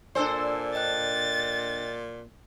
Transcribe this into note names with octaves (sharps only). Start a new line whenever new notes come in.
A#2 D4 A4 C5 D5 G#5 E6
D#5 G5 F#6 A6